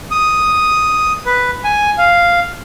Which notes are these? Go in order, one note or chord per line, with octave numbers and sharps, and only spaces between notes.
D#6
B4
G#5
F5